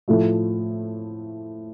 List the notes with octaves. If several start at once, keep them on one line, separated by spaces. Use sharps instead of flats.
A2 F3 A3